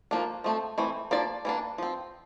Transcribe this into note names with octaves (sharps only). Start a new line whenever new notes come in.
F3 A#3 D4
F3 A3 C4
E3 A3 C4
F3 A#3 D4 D5
E3 A#3 D4
F3 C4